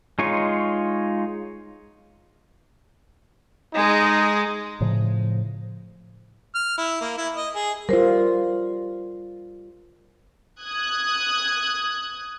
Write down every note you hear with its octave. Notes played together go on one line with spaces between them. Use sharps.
G#3 D#4 F4 C#5
G#3 D#4 G#4
A2 C#3 F3
F6
E4
A#3
E4
D#5
G#4
G3 F4 A#4 C5
D#6 F#6 G#6